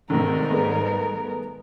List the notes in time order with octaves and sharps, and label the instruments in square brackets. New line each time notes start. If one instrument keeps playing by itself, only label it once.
[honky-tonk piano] B1 C3 [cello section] G#2 D#3 G3 [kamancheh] A#4
[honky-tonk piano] A3 B3 G#4